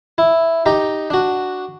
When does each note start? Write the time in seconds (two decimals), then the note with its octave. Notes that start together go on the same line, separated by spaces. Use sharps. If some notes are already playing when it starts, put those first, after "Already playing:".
0.18 E4
0.66 D#4 G4 A#5
1.10 D4 F#4